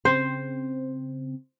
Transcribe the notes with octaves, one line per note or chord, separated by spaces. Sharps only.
C#3 C4 C5